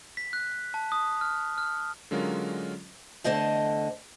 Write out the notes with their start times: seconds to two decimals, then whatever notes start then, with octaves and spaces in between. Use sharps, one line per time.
0.17 B6
0.33 F#6
0.74 A5
0.92 D#6
1.21 F6
1.58 F6
2.11 D3 F#3 G#3 C#4 F4 A#4
3.24 E2 D3 A3 C5 D#5 A5